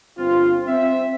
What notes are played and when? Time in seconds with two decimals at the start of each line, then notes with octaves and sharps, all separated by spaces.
0.18 G1 C4 F4
0.68 C4 E5